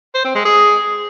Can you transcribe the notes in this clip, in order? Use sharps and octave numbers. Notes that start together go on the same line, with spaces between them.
C5
C4
G#3
G#4